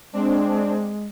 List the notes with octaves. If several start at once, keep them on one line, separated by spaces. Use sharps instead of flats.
G#3 C4 D4